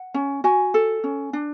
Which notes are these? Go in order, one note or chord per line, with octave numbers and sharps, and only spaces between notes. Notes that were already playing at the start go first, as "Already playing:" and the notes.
Already playing: F#5
C#4
F#4 G#5
A4
C#4
D4